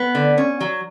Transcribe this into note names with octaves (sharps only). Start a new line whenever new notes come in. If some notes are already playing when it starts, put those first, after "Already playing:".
Already playing: B3
D3
C#4
F#3